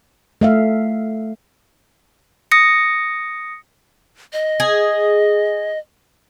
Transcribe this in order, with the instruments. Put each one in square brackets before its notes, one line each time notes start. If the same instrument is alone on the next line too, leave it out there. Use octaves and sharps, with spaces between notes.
[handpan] A3 E5 F5
[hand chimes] D#6 A#6 C#7
[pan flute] D#5
[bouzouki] G#4